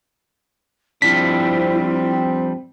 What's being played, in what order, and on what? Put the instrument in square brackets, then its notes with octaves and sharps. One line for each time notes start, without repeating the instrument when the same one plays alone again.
[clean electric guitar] F3 G3 D4 [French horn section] C4 [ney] E4 [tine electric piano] B6